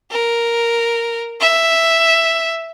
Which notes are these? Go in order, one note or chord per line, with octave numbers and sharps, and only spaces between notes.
A#4
E5